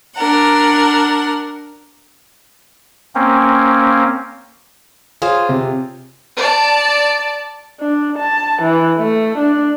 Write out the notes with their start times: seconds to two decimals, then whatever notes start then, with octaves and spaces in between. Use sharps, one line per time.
0.15 D4 A#4 F#5
3.15 A#3 C4 C#4
5.22 F4 G#4 C5 C#5 F5
5.49 C3
6.37 D5 A5
7.80 D4
8.18 A5
8.62 E3
8.98 A3
9.38 D4